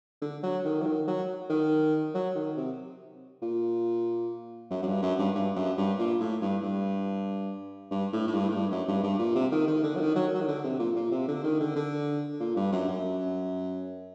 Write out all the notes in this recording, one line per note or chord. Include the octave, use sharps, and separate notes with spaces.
D3
F#3
D#3
F#3
D#3
F#3
D#3
F#3
D#3
C3
A#2
F#2
F#2
G2
F#2
G2
G2
F#2
G2
A#2
A2
G2
G2
G2
A2
A2
G2
A2
G2
F#2
G2
G2
A#2
C3
D#3
D#3
D3
F#3
D#3
F#3
F#3
D#3
D3
C3
A#2
A#2
C3
D3
D#3
D3
D3
A#2
G2
F#2
F#2